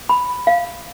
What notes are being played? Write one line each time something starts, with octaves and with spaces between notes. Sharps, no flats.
B5
F5